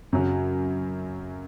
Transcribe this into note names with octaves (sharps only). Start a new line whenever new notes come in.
F#2 C#3 F#3